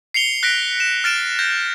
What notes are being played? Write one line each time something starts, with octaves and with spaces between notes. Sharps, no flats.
C7 C#7 F7 G7
F#6 A#6 B6 D7
E7
F6 A6 D7 E7
G6 A#6